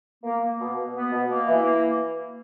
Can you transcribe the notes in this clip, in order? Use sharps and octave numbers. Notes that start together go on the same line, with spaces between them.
A#3
A#3
B2
B2
B3
B2
A#3
E3
A#3